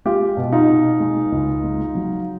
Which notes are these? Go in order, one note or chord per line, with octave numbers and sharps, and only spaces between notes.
G#3 F4 G4
B2
D#4 F4
B2
G#3
C#2
G#3
F#3